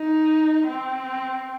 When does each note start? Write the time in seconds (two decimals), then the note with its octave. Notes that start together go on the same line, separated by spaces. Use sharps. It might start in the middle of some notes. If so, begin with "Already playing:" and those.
Already playing: D#4
0.68 C4